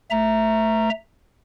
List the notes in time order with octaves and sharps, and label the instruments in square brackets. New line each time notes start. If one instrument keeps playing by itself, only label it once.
[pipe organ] A3 E5 A#5